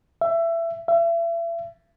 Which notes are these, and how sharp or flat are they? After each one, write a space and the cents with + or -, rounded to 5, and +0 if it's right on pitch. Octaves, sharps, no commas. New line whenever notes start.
E5 +20
E5 +35